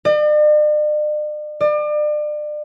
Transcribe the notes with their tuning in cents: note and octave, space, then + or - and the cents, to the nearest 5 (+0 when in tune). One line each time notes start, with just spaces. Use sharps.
D5 +45
D5 +35